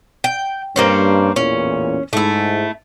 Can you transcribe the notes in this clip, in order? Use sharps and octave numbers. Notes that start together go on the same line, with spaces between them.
G5
G2 A#3 C4 C#4
A1 E2 A#2 C#4
G#2 A3 E4